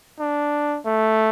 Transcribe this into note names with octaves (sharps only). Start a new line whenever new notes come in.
D4
A3